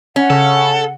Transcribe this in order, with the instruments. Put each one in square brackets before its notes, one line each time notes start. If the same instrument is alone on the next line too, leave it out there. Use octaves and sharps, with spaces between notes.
[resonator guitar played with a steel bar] C#4 [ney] F#5
[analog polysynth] C#3 [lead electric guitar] A4